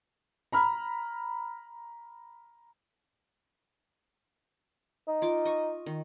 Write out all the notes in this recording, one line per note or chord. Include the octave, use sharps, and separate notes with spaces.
A#5 B5 F6
D#4
F4 D6
D#5 C#6
D#3